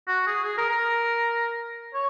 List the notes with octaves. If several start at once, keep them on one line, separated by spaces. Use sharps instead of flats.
F#4
G#4
G#4
A#4
A#4
C#5